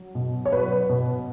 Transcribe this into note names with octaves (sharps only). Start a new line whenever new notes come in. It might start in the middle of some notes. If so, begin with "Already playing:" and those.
Already playing: F#3
B2
C#5
F#3 B4
B2